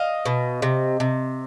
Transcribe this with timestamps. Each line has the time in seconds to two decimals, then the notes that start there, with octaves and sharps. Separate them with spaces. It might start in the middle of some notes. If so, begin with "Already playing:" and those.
Already playing: D#5 F5
0.26 B2
0.62 C3
1.00 C3